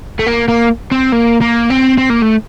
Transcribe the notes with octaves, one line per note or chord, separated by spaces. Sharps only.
A3
A#3
A#3
C4
A#3
A#3
C4
C4
A#3
A3